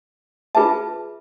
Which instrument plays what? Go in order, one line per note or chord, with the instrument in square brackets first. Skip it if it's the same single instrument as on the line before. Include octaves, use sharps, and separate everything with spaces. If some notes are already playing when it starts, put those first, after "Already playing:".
[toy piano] F4 G#4 B4 E5 A5